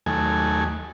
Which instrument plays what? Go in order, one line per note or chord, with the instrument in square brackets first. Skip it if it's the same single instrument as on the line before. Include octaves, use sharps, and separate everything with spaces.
[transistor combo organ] D#2 F#3 A3 G#5